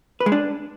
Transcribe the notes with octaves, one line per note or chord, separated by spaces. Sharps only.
B4
G#3
D4